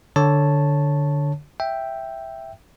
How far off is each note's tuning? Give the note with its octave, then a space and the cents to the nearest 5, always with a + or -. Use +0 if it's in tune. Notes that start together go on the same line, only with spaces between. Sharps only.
D3 +0 C#5 +0 A5 +0
E5 +0 G5 +0